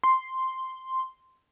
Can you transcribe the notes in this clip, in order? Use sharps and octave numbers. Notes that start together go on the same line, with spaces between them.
C6